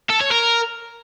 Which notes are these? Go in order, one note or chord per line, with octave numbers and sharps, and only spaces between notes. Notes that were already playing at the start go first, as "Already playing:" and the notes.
A4
C#5
A#4